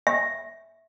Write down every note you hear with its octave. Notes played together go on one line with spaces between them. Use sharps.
E5